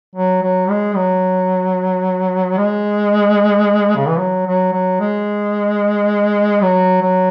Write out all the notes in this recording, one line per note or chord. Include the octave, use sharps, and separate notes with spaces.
F#3
F#3
G#3
F#3
G#3
C#3
E3
F#3
F#3
F#3
G#3
F#3
F#3